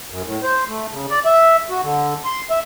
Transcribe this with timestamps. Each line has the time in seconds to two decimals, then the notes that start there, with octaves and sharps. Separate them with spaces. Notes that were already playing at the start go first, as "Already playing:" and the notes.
0.10 F#2
0.26 A2
0.43 C5
0.68 A3
0.92 C#3
1.10 D5
1.25 E5
1.70 F#4
1.83 D3
2.25 C6
2.50 E5